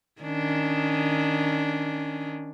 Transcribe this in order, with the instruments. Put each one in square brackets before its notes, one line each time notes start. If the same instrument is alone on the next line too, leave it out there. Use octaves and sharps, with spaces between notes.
[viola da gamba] D#3 C#4 D4